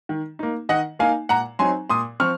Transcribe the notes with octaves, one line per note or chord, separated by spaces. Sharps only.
D#3
A#3 D#4
D#3 D#5 F#5
A#3 D#4 F5 G#5
A#2 F#5 A#5
F#3 C4 D#4 G#5 C6
A#2 C6 D#6
F3 C4 C#6 F6